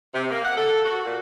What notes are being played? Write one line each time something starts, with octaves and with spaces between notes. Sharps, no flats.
C3
A#3
F#5
A4
F#4
A#2